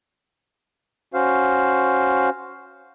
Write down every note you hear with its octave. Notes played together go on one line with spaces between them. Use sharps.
C#4 F#4 C5 F5